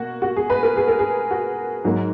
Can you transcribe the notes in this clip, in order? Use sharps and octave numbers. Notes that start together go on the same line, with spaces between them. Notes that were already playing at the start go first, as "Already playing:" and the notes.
Already playing: B2 A#3 F#4
F#4
G#4
B4
A#4
G#4
A#4
G#4
F#4
G#2 F#3 A#3